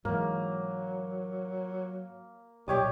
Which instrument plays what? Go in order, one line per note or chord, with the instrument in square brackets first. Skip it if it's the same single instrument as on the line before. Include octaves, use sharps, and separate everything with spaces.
[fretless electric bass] G#2 E3 [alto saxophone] F#3 [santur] A#3
[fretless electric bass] B1 A#2 [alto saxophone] G3 [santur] G4 C#5 D#5